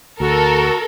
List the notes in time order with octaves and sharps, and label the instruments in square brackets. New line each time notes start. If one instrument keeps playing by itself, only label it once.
[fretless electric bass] D2 [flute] F#4 [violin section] A4 A#4